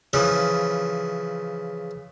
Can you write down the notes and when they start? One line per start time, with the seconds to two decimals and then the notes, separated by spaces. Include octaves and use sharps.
0.13 C#3 E3 F3